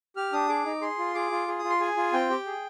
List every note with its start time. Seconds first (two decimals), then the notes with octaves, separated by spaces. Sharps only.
0.16 G4 F6
0.33 D4 D#6
0.49 G#4 D6
0.65 D#4
0.82 G#4 C6
0.98 F4
1.15 G#4 D6
1.31 F4
1.48 G#4
1.59 D#6
1.64 F4
1.70 C6
1.80 G#4 G#5
1.97 F4
2.13 C4 G5
2.30 G4
2.46 G#4